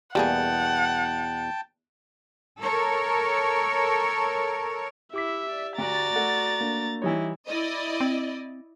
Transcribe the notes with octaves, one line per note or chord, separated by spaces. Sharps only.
E2 B2 G3 A#3 G#4 F#5 G5 A5
A4 A#4 C#5
E4 G4 E5 D6 B6
D5
D2 F#4 D5 A#5 A6
A3 F#5
A#3 D4
E3 G3 D#4 E4 C#5
E4 D5 D#5
C4